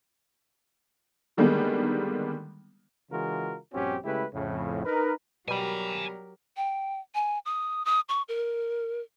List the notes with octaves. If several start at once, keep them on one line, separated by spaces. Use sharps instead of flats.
D3 D#3 G3 G#3 A#3 B3
C#3 E3 G#3 F4 F#4 A#4
A#1 G2 C4 C#4 F#4 G4
C#3 G#3 A3 E4 G4 B4
F2 A2 C#3
D#4 A#4 B4
B2 F#3 G3 G4 A#4 G#5 B5
G5
G#5
D#6
D#6
C#6
A#4